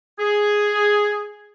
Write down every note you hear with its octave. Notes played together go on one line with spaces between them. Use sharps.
G#4